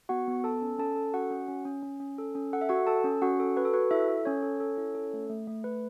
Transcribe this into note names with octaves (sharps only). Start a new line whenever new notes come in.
B3 F#4 F#5
B3
A4 A5
C#4
C#4 A4 A5
A4
C#4 F#4 F#5
C#4
C#4
C#4
C#4
C#4
A4
C#4
A4 F#5
E5
F#4 A4 F#5
A4 A5
C#4
C#4 F#4 F#5
A4
F#4 B4
A4
F#4 B4
E4 A4 E5
A4
C#4 C#5
A4
A4
E4
A4
A3
A3
A3
A3 B4